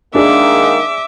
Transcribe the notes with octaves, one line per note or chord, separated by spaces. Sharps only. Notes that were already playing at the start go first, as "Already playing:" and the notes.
D#3 G#3 A#3 D4 G#4 E5 D6